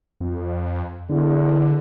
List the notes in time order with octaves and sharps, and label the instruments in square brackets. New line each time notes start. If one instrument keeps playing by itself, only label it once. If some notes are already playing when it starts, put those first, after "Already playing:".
[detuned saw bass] F2
[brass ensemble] E2 D4 [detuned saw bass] D3